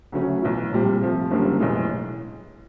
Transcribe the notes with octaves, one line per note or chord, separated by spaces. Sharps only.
D2 C#3 F#3 A3 C#4
B1 A2 E3
A#1 A#2 G3 C4
C3 F3 A3
F#1 F#2 D3 G3 A#3
B1 A2 E3 G#3